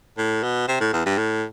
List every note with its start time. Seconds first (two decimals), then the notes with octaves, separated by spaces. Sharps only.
0.18 A2
0.43 B2
0.68 C3
0.80 A2
0.93 E2
1.06 G2
1.18 A2